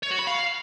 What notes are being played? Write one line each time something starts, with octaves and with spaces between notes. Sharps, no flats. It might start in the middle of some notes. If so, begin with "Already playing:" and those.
C#5
F#4
B5
F5